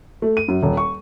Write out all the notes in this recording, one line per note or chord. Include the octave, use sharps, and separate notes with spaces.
A3
D#7
F#2
D#1
C#6